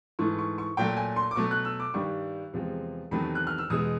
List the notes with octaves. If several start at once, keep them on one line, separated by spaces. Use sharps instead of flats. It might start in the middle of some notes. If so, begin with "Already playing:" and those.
G#2 E3 A3 C#6
C#6
C#6
A#2 F#3 A3 G5
G#5
C6
D6
B2 F#3 A3 C#6
F#6
E6
D6
G2 D#3 G3 C#6
E2 C3 F3 G#3
E2 C3 D#3 F#3 A3 B5
F#6
F6
E6
E2 B2 G#3 D#6